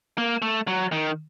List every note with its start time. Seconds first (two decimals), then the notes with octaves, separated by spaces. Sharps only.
0.18 A#3
0.42 A3
0.68 F#3
0.92 D#3